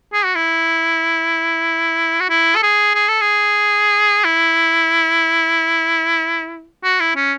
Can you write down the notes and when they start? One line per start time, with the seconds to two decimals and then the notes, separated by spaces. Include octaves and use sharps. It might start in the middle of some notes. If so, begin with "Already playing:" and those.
0.13 G#4
0.25 F#4
0.35 E4
2.20 F#4
2.30 E4
2.56 A4
2.63 G#4
2.95 G#4
3.08 A4
3.21 G#4
4.25 E4
6.84 F#4
7.00 E4
7.16 C#4